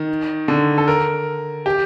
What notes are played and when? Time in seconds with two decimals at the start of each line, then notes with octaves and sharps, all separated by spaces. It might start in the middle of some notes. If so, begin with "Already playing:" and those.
Already playing: D#3
0.48 D3
0.78 A4
0.88 A#4
1.66 G4